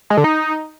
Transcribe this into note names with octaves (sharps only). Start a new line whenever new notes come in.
G#3
D3
D#4